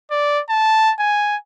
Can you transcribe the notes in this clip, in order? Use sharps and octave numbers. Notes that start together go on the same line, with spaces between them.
D5
A5
G#5